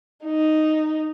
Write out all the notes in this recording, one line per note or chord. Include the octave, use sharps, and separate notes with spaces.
D#4